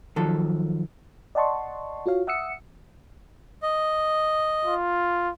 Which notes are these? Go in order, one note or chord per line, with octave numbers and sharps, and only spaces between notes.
D#3 F3 F#3 A4
D5 D#5 F#5 A5 C6 C#6
F4 F#4 C#5 F5
E5 F#5 D#6 E6 C#7
D#5
F4